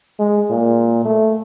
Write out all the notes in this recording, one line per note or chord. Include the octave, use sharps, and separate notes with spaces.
G#3
A#2
A3